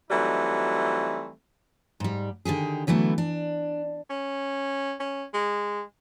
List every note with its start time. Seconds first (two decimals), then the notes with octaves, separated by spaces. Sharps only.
0.11 E3 F#3 G3 A3 C4 D#4
2.00 G#2 G3
2.45 D3 D#3 G4 G#4
2.87 D3 E3 F#3 A3 B3
3.18 D4
4.10 C#4
5.00 C#4
5.34 G#3